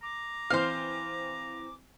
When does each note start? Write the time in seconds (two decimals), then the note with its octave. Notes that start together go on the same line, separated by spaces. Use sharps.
0.03 A#5 D6
0.50 E3 C4 C5 F5 F6